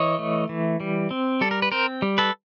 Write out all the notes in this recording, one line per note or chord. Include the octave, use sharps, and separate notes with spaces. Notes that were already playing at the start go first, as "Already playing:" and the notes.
Already playing: E3 C#5 D#5
A3
E3
G3
C4
G3 A4
A#4
B4
C4 A#4 C5
G3
A4 B4